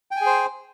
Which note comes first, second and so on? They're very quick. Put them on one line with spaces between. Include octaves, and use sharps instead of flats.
G5 G#5 G#4 C5